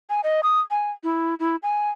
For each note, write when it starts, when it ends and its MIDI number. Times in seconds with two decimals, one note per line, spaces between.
0.10 0.21 80
0.24 0.41 75
0.43 0.60 87
0.71 0.91 80
1.04 1.35 64
1.40 1.56 64
1.63 1.90 80